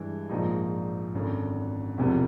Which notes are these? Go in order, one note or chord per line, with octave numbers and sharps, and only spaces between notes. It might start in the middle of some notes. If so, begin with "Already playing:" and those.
Already playing: G2 E3 G#3
A#1 G#2 F3 A#3 D#4
G#1 F#2 D3
E1 E2 C3 F3